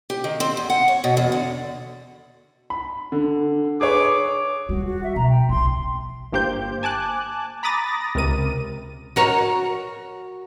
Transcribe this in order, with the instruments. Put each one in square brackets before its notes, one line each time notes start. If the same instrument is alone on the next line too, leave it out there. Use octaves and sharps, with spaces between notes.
[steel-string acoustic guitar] G4
D#3
C4
E2
F#5
C#5
B2
E2
D3
[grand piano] B5
D3
[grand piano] G#4 B4 C#5 [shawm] D6
[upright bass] D#3 G3 [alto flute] F#4
[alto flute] F#4
E5
[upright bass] B2 [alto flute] A#5
[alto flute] G5
[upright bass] B1 C#3 [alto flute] C6
[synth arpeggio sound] G1 A#3 G4 C5 G6
G#5 A5 D6 F#6
A#5 B5 D6 D#6 A6 A#6
C#2 C3 A#4 D#7
[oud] F#4 A#4 C#5